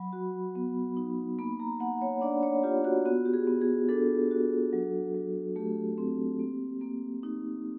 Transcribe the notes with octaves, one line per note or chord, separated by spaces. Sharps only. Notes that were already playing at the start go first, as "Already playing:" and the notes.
Already playing: F#3 B5
F#4
B3
D#4
A#3 B5
A#5
A#3 F#5
C#5
D4 D5
C#5
F4 G4
F#4
B3 F#4
G4
G#4
B3
G#4
D4 A4
F#4
F#3
F#3
A3 G4
C4
A#3
A#3
D#4